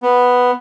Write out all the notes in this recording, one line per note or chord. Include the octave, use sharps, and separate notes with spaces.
B3